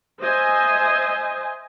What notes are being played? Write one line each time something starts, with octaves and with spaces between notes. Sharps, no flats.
C5 D#5 E5 G#5